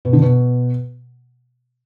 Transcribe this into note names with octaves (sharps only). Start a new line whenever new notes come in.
B2
D3
B2